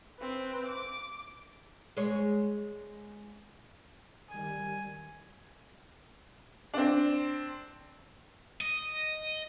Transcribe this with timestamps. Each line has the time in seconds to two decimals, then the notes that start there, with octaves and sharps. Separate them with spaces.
0.19 C4 B4
0.67 D6
1.97 G#3 C#5
4.29 D#3 G3 G#5
6.74 C4 D4
8.61 D#5